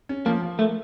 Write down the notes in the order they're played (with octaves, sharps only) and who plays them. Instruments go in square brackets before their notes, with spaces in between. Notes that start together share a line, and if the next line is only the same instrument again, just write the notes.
[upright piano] C#4
[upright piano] F3 [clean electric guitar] A#3
[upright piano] F3
[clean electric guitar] A3 [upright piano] A#3